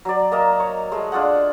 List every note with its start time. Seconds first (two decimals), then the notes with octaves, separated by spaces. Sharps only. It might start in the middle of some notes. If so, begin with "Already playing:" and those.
0.05 F#3 D5
0.32 A#3 A#4 D#5 A5
0.60 C#5
0.92 G#3 A3
1.12 D4 F4 G#4 F#5